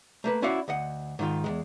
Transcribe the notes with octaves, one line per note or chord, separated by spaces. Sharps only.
A3 A#3 B4
C#4 E4 F#4 D5 F5 F#5
D2 D#5 F#5
G#2 D#3 F4
E2 A#2 G#3